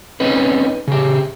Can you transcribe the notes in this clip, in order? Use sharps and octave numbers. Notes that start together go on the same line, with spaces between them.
C4 C#4 D#4 B4
C#3 G4